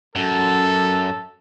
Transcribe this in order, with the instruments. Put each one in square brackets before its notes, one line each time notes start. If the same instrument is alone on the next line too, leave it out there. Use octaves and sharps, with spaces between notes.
[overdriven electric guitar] F#2 [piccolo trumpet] A4